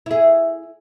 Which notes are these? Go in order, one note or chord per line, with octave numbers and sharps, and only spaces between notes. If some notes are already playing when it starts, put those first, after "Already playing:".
E4 G#4